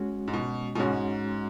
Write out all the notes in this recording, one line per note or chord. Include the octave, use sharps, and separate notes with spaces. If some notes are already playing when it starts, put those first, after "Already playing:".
Already playing: G#3 C#4 F#4
G#2
B2
B2
G#2 G#3 C#4 F#4